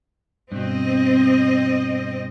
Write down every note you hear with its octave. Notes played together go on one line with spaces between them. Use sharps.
G2 B2 C4 D#5